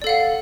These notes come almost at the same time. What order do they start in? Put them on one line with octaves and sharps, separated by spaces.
D5 A4 F5 F#5